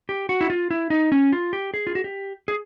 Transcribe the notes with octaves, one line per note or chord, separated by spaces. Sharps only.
G4
F#4
E4
F4
E4
D#4
C#4
F4
G4
G#4
F4
F#4
G4
G#4